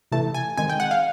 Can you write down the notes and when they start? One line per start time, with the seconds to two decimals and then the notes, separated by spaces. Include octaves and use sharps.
0.12 C3 E3 A3 A5
0.34 G#5
0.57 D#3 G#3 C4 G#5
0.70 G5
0.80 F#5
0.91 F5